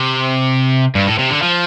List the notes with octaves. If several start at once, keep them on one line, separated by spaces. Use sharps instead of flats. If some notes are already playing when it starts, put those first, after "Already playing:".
Already playing: C3
G2
A2
C3
D3
F3